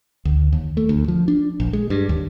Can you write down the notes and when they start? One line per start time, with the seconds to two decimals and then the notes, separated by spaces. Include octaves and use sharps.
0.25 D2
0.53 D#2
0.77 A3
0.89 D2
1.08 F3
1.28 D4
1.60 A#1
1.73 G#3
1.90 G2
2.09 D#2